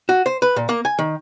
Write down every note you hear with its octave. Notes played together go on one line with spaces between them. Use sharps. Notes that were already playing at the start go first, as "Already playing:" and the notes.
F#4
C5
B4
A#2
A#3
G#5
D#3